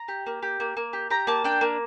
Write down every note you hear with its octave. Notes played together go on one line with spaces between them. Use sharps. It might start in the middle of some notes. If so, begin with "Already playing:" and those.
Already playing: A#5
G4
A#3
G4
A#3
A#3
G4
G4 A#5
A#3 A5
D4 G5
A#3